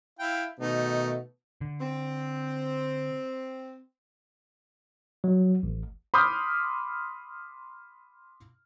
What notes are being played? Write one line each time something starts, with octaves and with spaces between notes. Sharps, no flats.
E4 F5 G5
B2 D#3 A3 D#4
D3
C4
F#3
A1
B5 C6 D6 D#6 F6 G6